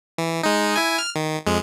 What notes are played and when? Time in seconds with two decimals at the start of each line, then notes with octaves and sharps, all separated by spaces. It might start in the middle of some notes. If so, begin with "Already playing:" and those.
0.18 E3
0.43 G#3 D#4
0.76 E4 G#5
0.98 F6
1.16 D#3
1.47 F2 G#3